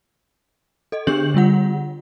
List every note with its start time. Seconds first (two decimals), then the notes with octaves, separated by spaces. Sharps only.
0.92 A4 D#5
1.07 D3 D4 G4 G#4 G6 F#7
1.34 D3 G3 F4 F#5